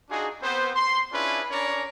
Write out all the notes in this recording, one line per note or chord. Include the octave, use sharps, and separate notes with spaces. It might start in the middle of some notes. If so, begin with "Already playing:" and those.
D4 D#4 F4 F#4 G#4
B3 C4 C5
C6
C#4 D4 E4 F4 G#4 B4
C#4 D4 A#4 C#5 D5 A#5